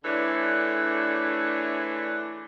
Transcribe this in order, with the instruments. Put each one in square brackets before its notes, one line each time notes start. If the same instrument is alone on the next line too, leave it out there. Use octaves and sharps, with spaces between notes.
[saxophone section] D3 E3 A3 D4 G#4 C#5